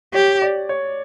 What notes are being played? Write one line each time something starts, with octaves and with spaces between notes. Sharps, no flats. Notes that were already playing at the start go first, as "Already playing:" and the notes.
G4 C#5
D5
C#5